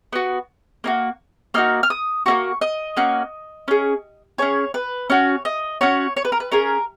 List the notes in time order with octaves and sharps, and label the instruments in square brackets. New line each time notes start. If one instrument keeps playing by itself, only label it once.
[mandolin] B3 F#4
A#3 D#4 F#4
A#3 D#4 F#4 F6
F6
D#6
A#3 C#4 F#4 C#6
D#5
A#3 C#4 F#4
C#4 G#4
C#4 G#4 C#5
B4
C#4 F#4 C#5
D#5
C#4 F#4 C#5
C#5
B4
A#4
B4
C#4 G#4 A#4